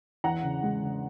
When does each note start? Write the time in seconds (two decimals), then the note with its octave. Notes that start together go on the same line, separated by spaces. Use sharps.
0.24 E2 F#5 A#5
0.43 C#3
0.63 G#3
0.82 C#3